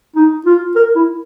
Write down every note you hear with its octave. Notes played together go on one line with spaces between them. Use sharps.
D#4
F4
A#4
E4